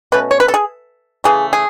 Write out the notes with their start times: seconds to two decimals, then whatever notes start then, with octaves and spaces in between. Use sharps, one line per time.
0.12 B2 A3 C#4 B4
0.31 C#5
0.40 B4
0.48 A4
0.54 G#4
1.24 C#3 E3 A3 G#4
1.53 G#4